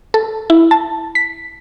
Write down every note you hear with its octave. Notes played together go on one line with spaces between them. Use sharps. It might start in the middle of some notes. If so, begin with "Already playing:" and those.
A4
E4
A5
B6